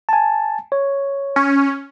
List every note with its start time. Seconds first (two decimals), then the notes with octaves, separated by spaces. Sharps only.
0.09 G#5 A5
0.72 C#5
1.36 C#4